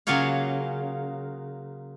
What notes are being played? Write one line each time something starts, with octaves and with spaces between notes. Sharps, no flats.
C#3 F#3 A#3 F4 C#5 F5